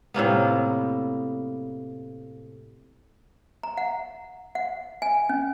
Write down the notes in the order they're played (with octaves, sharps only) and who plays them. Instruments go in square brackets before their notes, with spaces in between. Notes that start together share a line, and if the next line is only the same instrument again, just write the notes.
[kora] A2 C3 A#3 B3
[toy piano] A#5
F#5
F#5
G#5
C#4